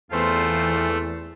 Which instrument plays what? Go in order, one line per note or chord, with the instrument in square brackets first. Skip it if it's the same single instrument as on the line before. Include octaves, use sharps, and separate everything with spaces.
[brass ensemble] E2 [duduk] E3 [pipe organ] A3 [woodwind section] C4 F4 C5